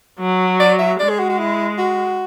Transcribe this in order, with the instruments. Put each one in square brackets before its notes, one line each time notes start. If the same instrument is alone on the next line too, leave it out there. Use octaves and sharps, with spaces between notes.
[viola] F#3
[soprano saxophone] D5
E5
[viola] G#3 [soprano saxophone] D5
[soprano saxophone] G#4
F#4
F#4
E4
F#4